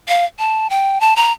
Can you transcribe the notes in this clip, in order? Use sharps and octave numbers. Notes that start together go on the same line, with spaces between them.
F5
A5
G5
A5
A#5